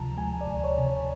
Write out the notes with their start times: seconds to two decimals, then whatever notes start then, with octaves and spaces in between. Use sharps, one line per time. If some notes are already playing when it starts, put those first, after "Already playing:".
Already playing: D2 C3 F3 A5 A#5
0.17 G#3 G#5
0.41 D5
0.47 D2
0.64 C#5
0.78 C3
0.86 C#5